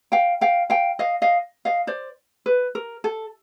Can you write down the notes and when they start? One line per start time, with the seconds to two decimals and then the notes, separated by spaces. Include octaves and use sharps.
0.12 F5 G5
0.41 F5 G5
0.70 F5 G5
0.99 D#5 F5
1.22 D#5 F5
1.65 D#5 F5
1.87 C5 D5
2.46 B4
2.75 A#4
3.04 A4